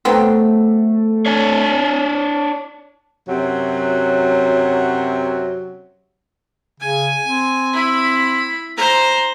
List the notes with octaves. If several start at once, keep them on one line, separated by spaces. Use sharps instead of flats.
F#3 A3 B3 C4
D4 C#5
F#2 C3 F#3
C#3 G#5
C4
E4 B5
C5 A#5